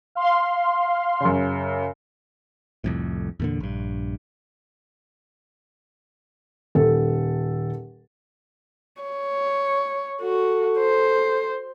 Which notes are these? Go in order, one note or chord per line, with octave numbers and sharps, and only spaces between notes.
F5 C6
F#2 C#3
C2 F2 A2
E2 A#2 D3
A#1 G2
D#1 A4
C#5
F#4 A4
C5